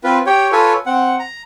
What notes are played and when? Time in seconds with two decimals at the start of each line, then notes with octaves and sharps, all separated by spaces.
0.04 C4 F4 B4
0.26 G4 C#5 G5
0.52 F4 A4 B4 C#5 G#5
0.86 C4 F#5
1.19 A#5